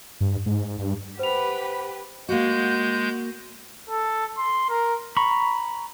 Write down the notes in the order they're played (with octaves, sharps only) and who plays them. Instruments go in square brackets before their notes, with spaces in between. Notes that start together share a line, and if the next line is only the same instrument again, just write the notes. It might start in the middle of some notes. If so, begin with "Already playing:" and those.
[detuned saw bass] G2
G#2
G2
[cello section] G4 B4 [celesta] C5 F7 [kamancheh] F#5 B5
[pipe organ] G#3 G6 [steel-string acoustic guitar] A#3 F#4
[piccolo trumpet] A4
C6
A#4
[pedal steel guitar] A#5 B5 C#6